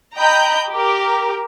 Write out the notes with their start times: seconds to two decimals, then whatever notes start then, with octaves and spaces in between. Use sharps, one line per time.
0.16 D#5 G5 A#5 B5 G6
0.72 G4 A#4